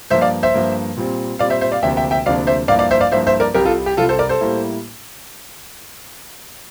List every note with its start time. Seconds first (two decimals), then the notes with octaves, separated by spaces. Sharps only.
0.10 G2 F3 A#3 C5 E5
0.21 D5 F5
0.43 C5 E5
0.54 G2 F3 A#3
0.97 A#2 G3 C4
1.39 A#2 G3 C4 D5 F5
1.50 C5 E5
1.61 C5 E5
1.72 D5 F5
1.83 D2 C3 F3 A#3 D4 E5 G5
1.97 E5 G5
2.11 E5 G5
2.26 D2 C3 F3 A#3 D4 D5 F5
2.47 C5 E5
2.68 G2 F3 A#3 E4 D5 F5
2.79 D5 F5
2.91 C5 E5
3.00 D5 F5
3.11 G2 F3 A#3 E4 C5 E5
3.27 C5 E5
3.40 A#4 D5
3.55 C2 C3 G3 G4 A#4
3.65 F4 A4
3.86 G4
3.97 C2 C3 G3 F4 A4
4.09 A4 C5
4.19 A#4 D5
4.29 A4 C5
4.41 A2 G3 A#3 E4